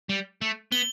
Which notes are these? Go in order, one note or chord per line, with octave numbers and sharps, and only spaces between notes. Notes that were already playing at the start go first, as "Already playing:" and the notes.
G3
A3
B3 G7